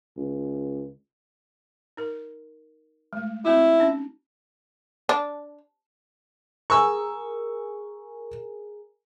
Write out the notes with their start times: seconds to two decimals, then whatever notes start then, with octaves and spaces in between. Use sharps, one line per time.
0.17 C#2
1.97 D#4 A#4
3.13 G#3 A3
3.45 C4 E4 F#4
3.80 C#4 D#4
5.09 D4
6.70 G#4 A#4 C#6 E6